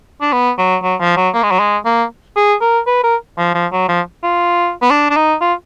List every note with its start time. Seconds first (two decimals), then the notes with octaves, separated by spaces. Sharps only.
0.21 D4
0.33 B3
0.58 F#3
0.83 F#3
1.00 F3
1.17 F#3
1.34 A#3
1.43 G#3
1.51 F#3
1.60 G#3
1.85 A#3
2.36 G#4
2.61 A#4
2.87 B4
3.03 A#4
3.38 F3
3.54 F3
3.72 F#3
3.88 F3
4.23 F4
4.82 B3
4.90 D4
5.10 D4
5.16 D#4
5.41 F4